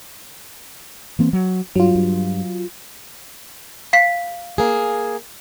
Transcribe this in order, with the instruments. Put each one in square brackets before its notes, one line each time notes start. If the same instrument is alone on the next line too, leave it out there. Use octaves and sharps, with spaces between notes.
[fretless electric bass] E3 A#3 C4
F#3
[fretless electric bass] G2 [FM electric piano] F#3 F4
[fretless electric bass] G2
[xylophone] F5 B6
[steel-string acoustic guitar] A#3 G#4